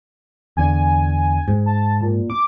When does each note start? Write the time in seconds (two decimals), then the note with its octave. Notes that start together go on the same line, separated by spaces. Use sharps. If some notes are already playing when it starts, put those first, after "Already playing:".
0.57 E2 D3 G#5
1.48 G#2
1.66 A5
2.01 A#2
2.30 D6